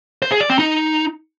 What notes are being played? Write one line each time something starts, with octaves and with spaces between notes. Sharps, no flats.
C5
G#4
D5
C4
D#4